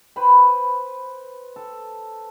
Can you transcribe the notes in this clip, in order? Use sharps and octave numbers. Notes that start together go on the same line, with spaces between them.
B4 C5 B5
A4